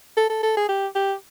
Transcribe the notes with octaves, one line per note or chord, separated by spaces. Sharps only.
A4
A4
A4
G#4
G4
G4